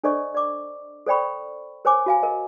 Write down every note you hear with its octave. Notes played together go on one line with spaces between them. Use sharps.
D4 A4 C5 D5 D#5 C#6
D5 D6
A4 C5 D5 G5 B5 C#6
A#4 C5 C#5 G#5 D6
F#4 F5 G#5
A#4 D#5